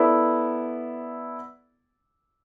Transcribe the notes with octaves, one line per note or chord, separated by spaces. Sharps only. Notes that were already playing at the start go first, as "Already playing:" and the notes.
Already playing: B3 E4 A4 D5